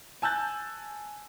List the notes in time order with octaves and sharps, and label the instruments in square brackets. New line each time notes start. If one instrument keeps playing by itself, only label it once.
[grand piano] G#5 A5 E6 F#6 G6 A6